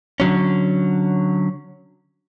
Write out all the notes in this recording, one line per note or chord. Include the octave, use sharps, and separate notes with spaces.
D3 F#3 C#4